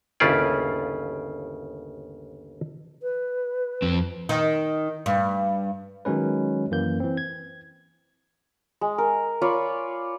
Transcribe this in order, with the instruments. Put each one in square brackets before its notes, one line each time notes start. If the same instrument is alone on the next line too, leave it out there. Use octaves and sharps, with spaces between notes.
[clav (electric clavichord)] G1 D#2 C#3 E4 F4 D5
[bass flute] B4
[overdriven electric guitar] F2 C4
[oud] D#3
G2
[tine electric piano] D#3 F#3 G#3 C#4 B4
F#2 E3 A#3 G6
E3 C4
G#6
[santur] G#3
A#4
F4 C#5 D5 B5